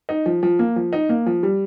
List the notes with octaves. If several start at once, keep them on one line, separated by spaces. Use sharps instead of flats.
D#4
F3
F3
A#3
F3
D#4
A#3
F3
G3